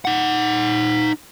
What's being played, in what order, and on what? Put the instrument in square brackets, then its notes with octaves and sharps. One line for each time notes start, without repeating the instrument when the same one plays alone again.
[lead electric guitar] D#4 F#5